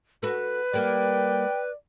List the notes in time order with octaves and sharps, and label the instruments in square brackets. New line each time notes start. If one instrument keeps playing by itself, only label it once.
[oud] F#4 A4 [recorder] B4
[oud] G3 A#3 [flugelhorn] D5 [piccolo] G5